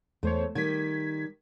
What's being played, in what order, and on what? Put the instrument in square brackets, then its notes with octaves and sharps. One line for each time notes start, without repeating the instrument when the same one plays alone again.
[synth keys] E2 C5 C#5 [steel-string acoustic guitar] A3
[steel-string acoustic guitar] D#3 G3 [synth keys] G#6 B6